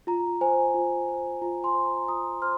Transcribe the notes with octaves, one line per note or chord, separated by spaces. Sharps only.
F4 A#5
C5 G#5
F4
C5
F4 A#5
G#5 C6
C5
A#5
F4 A#5 D#6
C5 C6 F6